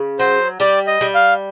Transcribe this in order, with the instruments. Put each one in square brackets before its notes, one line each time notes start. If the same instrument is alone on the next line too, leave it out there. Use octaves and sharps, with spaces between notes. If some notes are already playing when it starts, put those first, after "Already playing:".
Already playing: [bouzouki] C#3
[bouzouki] F#3 [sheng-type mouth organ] C5
[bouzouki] G3 [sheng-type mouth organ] D5
[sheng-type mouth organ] D#5
[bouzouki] G3
[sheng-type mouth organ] F5